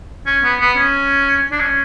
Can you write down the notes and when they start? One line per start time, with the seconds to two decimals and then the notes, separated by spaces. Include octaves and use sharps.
0.27 C#4
0.44 B3
0.60 B3
0.77 C#4
1.52 D4
1.60 C#4